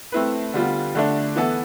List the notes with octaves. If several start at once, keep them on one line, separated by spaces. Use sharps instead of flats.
A3 C4 E4 B4
D3 G3 B3 F4
D3 A3 D4
E3 B3 E4 A4